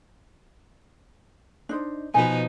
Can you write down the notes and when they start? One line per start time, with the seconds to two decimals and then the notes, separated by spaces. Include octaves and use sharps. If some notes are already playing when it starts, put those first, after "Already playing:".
1.69 D4 D#4 C5
2.14 B2 F3 D#4 B4 G#5